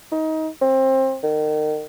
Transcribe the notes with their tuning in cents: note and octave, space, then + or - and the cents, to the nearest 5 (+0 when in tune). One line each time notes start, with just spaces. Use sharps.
D#4 +25
C4 +25
D#3 -30